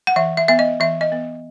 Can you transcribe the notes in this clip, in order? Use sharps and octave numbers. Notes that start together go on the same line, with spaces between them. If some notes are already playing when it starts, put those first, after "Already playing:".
F#5
E3 E5
E5
B3 E5
D#5
E3 E5
D#5
B3